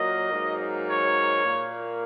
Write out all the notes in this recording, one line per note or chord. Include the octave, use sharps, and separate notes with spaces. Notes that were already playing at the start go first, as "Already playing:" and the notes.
Already playing: A#2 F#3 A#3 D#5
G#2 F#3 A#3
C#5
A#2 A#3